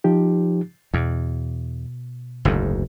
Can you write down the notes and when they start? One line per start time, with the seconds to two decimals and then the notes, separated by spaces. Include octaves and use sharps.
0.04 F3 D#4 G4
0.94 E2 B2
2.45 F#1 D2 G#2